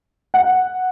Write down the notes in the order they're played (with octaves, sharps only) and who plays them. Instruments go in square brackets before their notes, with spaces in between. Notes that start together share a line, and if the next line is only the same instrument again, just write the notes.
[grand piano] F#5